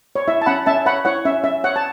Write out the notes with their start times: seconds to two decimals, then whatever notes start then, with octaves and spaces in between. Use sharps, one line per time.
0.15 C#5
0.28 E4 E5
0.41 A5
0.46 C#4 F#5 B5
0.66 C#4 E5 A5
0.86 C#5 F#5 B5
1.05 E4 C#5 F#5
1.25 C#4 E5
1.44 C#4 E5
1.64 C#5 F#5
1.76 A5